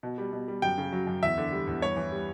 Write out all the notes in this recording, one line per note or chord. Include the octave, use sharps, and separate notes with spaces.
B2
G3
B2
G3
F#2 G5
C#3
F#3
F#2
E2 E5
D3
G3
E2
G2 C#5
E3
G3